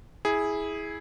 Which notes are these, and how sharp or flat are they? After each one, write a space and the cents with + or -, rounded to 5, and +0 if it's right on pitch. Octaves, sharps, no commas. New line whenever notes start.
E4 -15 G#4 +0